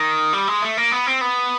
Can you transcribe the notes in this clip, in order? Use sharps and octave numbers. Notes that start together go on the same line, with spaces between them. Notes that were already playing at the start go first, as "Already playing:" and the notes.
Already playing: D#3
G3
G#3
A3
A#3
B3
C4
B3